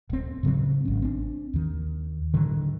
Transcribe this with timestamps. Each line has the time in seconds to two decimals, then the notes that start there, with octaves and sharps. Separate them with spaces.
0.10 D1 C4
0.43 A2 C#3 F#3 C4
0.85 G#1 C#4
1.02 C4 D4
1.54 D#2 D#3
2.34 A2 D3 D#3 F#3